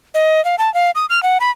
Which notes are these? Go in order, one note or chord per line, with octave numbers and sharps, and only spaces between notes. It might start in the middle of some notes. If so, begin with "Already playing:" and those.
D#5
F5
A5
F5
D#6
F6
F#5
B5